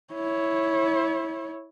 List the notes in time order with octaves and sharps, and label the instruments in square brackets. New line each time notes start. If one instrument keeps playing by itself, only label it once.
[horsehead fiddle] E4 C#5